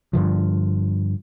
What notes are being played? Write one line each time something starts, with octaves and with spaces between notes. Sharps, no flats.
G2 D3 F3